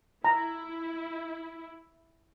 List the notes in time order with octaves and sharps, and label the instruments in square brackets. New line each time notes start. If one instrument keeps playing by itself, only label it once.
[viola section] E4 [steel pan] A#5